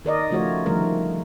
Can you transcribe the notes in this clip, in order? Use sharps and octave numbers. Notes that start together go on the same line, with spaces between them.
D#3 A#4 D5 D#5
C#3 F3 A3 F4 F#4 C#5
D3 D#3 F3 G3 A3 A#4